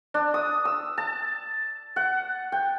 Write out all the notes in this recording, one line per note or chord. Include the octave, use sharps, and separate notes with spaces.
D4
D#6
E6
A5
F#5
G5